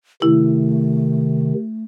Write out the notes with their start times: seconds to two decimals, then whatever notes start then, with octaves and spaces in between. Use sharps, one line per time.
0.22 C3 D#3 A3 E4